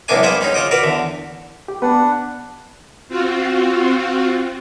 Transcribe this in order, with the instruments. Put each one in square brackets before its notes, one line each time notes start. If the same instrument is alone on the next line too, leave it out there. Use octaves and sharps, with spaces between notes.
[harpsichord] C2 F#2 A#3 B3 D4 G#5
G3 A#3 B3 G#4 C5
G#3 C#4 D#4
C#3 F4 D#5 D6
F#4 A#4 B4 D5
E2 D3
[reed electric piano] G4
[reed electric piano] B3 B4 [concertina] D4 F#5
[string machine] C4 F4 F#4